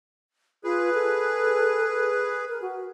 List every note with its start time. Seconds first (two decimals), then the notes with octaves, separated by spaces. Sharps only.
0.64 F4 G#4 B4
0.93 A4
2.48 A#4
2.62 F#4